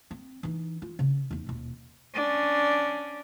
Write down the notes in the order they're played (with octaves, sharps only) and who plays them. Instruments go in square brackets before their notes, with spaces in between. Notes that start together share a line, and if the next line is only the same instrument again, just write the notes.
[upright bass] C4
E3 D#4
F4
C#3
E2 D#4
D#1 B2
[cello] C#4 D4